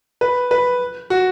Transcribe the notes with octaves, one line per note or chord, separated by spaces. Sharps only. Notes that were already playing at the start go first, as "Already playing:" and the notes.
B4
B4
F#4